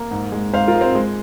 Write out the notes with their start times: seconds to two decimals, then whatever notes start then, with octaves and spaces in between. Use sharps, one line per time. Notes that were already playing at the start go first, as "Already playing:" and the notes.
Already playing: A#3
0.11 G#2
0.32 G#3
0.53 G#2 C5 F5
0.67 F4 A#4
0.75 G#3
0.81 C4
0.95 G#3